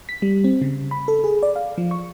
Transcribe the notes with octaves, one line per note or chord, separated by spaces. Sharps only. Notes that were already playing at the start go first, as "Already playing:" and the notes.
B6
G3
C4
C#3
B5
A4
G#4
D5
F5
F3
C#6